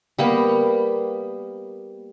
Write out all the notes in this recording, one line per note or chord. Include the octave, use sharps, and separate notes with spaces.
G3 A#3 B3